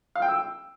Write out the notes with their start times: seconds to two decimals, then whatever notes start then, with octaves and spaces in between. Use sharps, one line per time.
0.16 F5
0.22 G5
0.29 E6